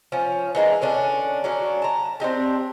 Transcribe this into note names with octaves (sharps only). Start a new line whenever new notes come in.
F3 C#4
E3 G#3 A#3 D4
D3 C#4 D4
F#3 C#4 D4 F#4
A5 A#5
C4 D4 D#4 G4